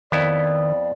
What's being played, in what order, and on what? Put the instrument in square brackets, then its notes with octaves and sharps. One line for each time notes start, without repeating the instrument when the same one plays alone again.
[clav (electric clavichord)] F2 B3 E4 [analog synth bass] D#3 [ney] D5